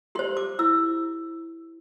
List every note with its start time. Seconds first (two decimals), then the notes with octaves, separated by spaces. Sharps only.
0.15 G4 C6
0.19 C5
0.37 D6
0.59 E4 E6